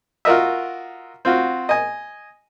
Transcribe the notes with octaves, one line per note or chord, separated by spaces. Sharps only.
F4 F#4 A#4 D#5 E5
C4 F4 F#4
D#5 G#5